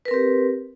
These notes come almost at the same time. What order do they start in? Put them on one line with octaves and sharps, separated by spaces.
B4 A#4 C4 G4